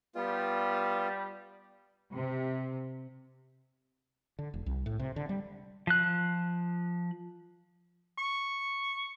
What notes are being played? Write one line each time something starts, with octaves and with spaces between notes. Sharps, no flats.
G3 B3 F4
C3
D3
E1
C2
A2
C3
D3
G3
F3 F#6
C#6